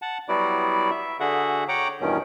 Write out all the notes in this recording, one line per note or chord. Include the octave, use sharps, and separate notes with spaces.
F#5 A5
F#3 G3 B3 E4 F#4 D5
E5
D3 F#4 G#4 E5 F#5
C#5 F#5 G5 A#5 D6
E2 G2 B2 D#3 C#4